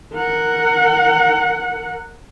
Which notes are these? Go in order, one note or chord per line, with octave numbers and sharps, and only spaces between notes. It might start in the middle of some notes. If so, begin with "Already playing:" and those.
A#4 F#5